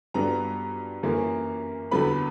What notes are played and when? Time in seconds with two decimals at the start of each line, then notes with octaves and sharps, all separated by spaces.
0.14 G2 F#3 B3 D4 A#5
1.03 F#2 E3 A#3 C#4
1.91 E2 D3 F#3 B3 B5